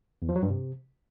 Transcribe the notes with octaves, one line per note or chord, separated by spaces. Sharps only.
E2
F3
F#3
G2
C3